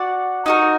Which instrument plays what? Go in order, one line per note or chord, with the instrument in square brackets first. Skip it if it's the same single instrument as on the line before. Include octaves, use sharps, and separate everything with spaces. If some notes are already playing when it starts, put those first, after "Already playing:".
Already playing: [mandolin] F#4 D5 F#5
D#4 F#4 A#4